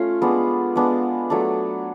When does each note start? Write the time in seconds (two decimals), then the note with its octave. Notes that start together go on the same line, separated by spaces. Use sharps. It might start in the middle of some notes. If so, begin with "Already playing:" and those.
Already playing: A3 C#4 F4
0.22 G#3 B3 D4
0.76 G#3 B3 D4
1.30 F#3 A3 D4